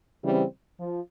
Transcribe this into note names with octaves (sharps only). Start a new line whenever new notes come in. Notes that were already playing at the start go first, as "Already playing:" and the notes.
C#3 E3 G3 C4
F3